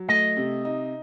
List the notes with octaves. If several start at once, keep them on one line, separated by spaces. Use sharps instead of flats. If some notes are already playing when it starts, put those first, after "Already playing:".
Already playing: F#3
A3 D#5
C3
D#4